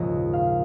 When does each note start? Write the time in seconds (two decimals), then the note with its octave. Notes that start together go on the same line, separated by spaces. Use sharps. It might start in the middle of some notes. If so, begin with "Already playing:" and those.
Already playing: A#1 D#2 G#2 C#3 F3 G#3 D#5
0.33 F5